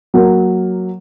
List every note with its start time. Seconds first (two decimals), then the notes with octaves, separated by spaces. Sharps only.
0.14 F#3 A#3